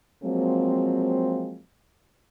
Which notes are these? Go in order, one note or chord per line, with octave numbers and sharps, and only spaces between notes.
F3 F#3 G#3 A#3 C4